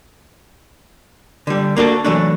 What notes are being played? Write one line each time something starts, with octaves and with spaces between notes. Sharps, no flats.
D3 G3
A#3 D4 F#4 A4
E3 F#3 A3 D4